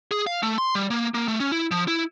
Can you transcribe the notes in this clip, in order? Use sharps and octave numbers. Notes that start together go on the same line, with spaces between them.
G#4
F5
A3
C6
G3
A#3
A#3
A3
C#4
E4
F3
E4